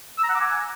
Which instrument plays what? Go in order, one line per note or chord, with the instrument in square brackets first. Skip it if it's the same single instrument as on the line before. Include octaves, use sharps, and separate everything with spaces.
[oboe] E6
A#5
F#5
D6
G#5